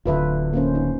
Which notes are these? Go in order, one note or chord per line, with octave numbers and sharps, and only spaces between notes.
D1 D3 F4 B4 E5
A#3 C#4 C5
D#4